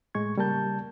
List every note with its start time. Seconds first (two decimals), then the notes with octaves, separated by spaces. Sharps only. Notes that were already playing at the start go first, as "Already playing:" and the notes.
0.15 A2 G#3 C#6 G#6
0.37 C#3 G3 A#3 A#4 A5 G6